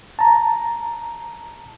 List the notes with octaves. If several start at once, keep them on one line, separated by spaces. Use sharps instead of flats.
A5 A#5